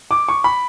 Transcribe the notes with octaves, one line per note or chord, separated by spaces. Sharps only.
D6
C#6
B5